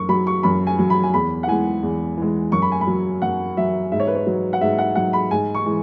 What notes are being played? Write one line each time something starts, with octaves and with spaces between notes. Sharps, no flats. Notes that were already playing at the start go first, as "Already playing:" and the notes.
Already playing: F#2 C#6
F#3 B5
C#6
F#2 B5
G#5
F#3
B5
G#5
E2 B5
F#5
E3 G#3 G#5
E2
E3 G#3
F#2 C#6
B5
G#5
B5
F#3
F#2 F#5
F#3 E5
G#2 E5
C#5
B4
C#5
F#3
F#5
G#2 E5
F#5
F#3 F#5
B5
G#2 G#5
C#6
E3 G#3